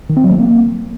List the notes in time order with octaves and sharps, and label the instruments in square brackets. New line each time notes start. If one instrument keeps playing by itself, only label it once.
[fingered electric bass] D#3
C4
F#3
A3
A#3